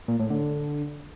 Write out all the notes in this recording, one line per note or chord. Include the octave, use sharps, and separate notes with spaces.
A#2
A2
D3